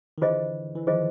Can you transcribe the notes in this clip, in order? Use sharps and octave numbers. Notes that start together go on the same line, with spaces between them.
D#3
D3 E3 F4 G#4 C5 D#5
E3
D#3 F3 F4 G#4 C5 D#5